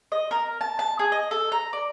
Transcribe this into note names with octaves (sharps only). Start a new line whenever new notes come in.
D#5
A#4
A5
A5
G#4
D#5
A4
A#5
D5